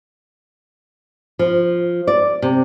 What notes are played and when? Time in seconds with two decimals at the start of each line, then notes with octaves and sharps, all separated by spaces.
1.39 F3
2.07 D5
2.42 C3